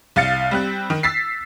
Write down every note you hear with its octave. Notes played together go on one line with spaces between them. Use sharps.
C2 F5 A6 C#7
G3 C4 F#6
D#3
E6 A6 B6 C7